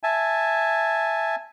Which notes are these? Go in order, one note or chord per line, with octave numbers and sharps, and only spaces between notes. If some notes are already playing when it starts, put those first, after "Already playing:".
E5 G#5 A5